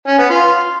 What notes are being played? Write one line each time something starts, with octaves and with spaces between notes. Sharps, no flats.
C#4
B3
F4